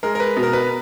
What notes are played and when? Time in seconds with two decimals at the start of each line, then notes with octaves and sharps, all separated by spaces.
0.03 G#3 A#4
0.15 A#4
0.20 B4
0.37 B2
0.43 A#4
0.53 B4